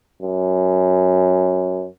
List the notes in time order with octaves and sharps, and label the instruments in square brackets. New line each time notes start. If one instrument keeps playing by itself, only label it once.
[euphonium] F#2